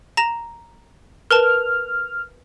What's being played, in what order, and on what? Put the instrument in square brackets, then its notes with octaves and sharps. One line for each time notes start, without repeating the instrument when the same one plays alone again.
[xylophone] A#5 A#6 E7
[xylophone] A#4 B4 A5 [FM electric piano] F6